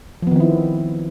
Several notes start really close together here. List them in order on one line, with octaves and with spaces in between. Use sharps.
F3 B3 D#3 C4 E4